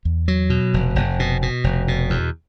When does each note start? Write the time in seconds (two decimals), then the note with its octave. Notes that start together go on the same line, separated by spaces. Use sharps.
0.05 E2
0.28 F#3
0.50 B2
0.74 F1
0.95 F1
1.19 B2
1.42 B2
1.64 F1
1.88 B2
2.10 E2